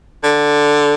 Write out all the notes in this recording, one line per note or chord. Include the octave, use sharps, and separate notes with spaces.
D3